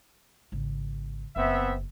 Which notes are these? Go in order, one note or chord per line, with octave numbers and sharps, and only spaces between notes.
G#1 C#3
F#1 B3 C4 E5